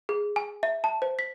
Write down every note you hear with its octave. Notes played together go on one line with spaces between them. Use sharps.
G#4
G#5
E5
A5
C5
B6